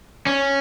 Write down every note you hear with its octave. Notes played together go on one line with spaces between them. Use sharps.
C#4